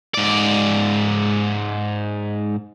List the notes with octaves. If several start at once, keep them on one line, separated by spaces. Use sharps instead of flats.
G#2 D5